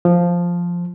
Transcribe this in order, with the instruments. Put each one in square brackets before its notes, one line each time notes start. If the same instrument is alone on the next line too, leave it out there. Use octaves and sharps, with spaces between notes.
[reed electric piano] F3